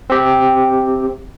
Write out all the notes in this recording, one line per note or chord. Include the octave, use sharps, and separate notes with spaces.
C4 G4